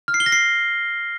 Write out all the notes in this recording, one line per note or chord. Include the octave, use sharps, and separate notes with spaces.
F6
C7
G7
A#6
C7